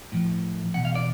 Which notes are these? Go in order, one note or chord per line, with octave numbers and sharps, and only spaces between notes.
A2 F3
E2 B2 F#5
F5
D5